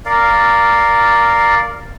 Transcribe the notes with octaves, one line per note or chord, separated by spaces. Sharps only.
A#4 D5 F5